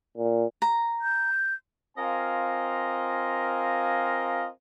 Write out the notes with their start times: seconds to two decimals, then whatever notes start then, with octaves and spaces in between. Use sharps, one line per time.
0.17 A#2
0.62 A#5
1.02 G6
1.98 C4 F4 A#4 D#5 F5 G#5